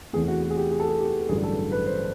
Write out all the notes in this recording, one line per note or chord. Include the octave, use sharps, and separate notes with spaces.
E2 C3 E3 A3 G#4
F#4
F#4
G#4
G4
G#4
A4
G#4
G4
A1 G2 D3 F#3 G#4
A4
B4
C5